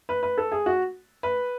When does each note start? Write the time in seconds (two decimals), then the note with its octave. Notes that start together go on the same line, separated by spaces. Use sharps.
0.09 B4
0.23 B4
0.38 A4
0.52 G#4
0.66 F#4
1.23 B4